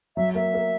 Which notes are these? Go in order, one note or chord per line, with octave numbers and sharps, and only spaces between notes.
F#3 E5
A#3 E5
A#3